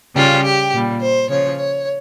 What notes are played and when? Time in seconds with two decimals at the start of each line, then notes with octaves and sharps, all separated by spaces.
0.15 C#3 G3 F4
0.43 G4
0.73 A#2 G3
1.00 C5
1.29 C#3 F3 C#5
1.57 C#5